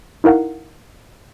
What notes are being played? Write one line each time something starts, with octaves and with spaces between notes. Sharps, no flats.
D#4 E4 A#4 F5 F#5